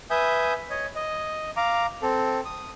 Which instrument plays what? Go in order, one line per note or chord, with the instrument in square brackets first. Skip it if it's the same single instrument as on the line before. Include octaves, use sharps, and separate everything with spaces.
[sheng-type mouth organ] B4 E5 G#5 D#6 G6
C#5 D#5
D#5
F5 A#5 D6
C4 A4
D#6